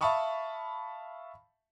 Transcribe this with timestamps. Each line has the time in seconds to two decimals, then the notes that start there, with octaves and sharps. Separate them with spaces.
0.01 E5 F5 A5 B5 C#6 D#6